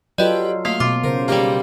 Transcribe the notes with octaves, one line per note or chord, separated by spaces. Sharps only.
F#3 F4 G4 A4 B4 D5 D#5
A3 A#3 F5
B2 F4 D6
C#3 A#4 C5
G3 A#3 D#4 G4 A#4